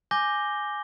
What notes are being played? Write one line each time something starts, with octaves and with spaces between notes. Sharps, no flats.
G#5 D6 G6 A#6 G7